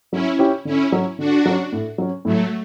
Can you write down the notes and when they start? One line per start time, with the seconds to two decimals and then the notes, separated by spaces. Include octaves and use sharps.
0.12 F#3 C#4 E4
0.39 C#4 E4 G4 C#5
0.65 D3 C#4 E4
0.92 F#3 C#4
1.19 D3 D4 F#4
1.45 F#3 C#4
1.72 A2
1.98 F#3 C#4
2.25 A2 F#3 A3